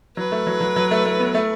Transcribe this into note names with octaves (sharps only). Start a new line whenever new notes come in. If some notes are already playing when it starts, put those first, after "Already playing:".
F#3 B4
A3
F#3
F#3
F#3
A3
A3
B3
A3